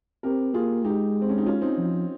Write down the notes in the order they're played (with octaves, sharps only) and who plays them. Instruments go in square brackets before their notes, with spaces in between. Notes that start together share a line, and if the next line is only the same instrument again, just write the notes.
[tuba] C4 [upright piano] G4 A#4
[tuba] A#3 [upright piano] F4 G#4
[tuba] G#3 [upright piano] D#4 G4
[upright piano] C4
C#4
D#4
C#4 F4
C4 D#4
[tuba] F3